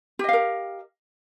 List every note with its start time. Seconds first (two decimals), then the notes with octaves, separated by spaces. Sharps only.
0.19 G4
0.24 D#5
0.29 F5
0.33 A#4